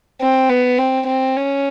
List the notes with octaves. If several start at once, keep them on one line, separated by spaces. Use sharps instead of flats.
C4
B3
C4
C4
C#4